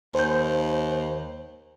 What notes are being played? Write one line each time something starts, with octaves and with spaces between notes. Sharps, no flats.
D#2 C5 G6